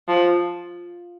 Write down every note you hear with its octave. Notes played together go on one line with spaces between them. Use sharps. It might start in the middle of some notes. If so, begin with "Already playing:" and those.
F3